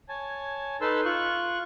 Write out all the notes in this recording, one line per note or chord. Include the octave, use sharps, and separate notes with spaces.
C#5 G#5 A5
D#4 A4 B4 A5 C6 E6
F4 C#6 F#6